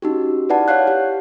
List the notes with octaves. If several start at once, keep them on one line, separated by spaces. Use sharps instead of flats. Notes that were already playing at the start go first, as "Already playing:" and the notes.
C#4 D#4 F#4 G4
E4 B4 D5 F#5 A5
C#5 F5 F#5 F#6
G4